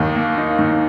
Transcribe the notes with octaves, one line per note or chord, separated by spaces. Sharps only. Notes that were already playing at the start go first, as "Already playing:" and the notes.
Already playing: D#2 D#3 D#4
A#3
D#4
D#3